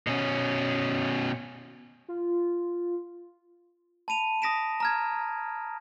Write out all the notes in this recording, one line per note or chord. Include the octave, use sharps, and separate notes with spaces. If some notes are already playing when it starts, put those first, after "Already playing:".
B2 C#4
F4
A5 B5 D#7 F7
D#6 A#6 B6 D7 E7
A#5 F6 G#6